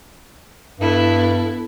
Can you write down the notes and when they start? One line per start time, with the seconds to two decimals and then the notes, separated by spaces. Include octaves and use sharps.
0.80 G2 B3 E4 A4